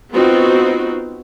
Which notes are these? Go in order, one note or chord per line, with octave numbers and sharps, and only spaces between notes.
B3 C4 D#4 F4 F#4